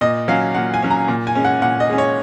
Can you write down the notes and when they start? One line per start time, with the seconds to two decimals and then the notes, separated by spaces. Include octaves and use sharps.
0.01 A#2 D#5
0.28 F#3 C#4 F5
0.55 A#2 F#5
0.74 G#5
0.82 F#3 C#4
0.90 A#5
1.08 A#2
1.27 G#5
1.35 G#3 C#4
1.45 F#5
1.62 A#2 F#5
1.80 D#5
1.90 G#3 C#4
1.98 C#5